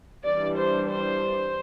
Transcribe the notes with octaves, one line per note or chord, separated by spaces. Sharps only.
E3 G3 D4 D5
C5
C5